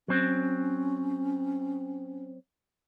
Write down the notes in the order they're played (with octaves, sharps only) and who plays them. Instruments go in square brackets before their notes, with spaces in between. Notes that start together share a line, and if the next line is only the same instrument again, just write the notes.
[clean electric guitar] F#3 C4 [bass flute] C#4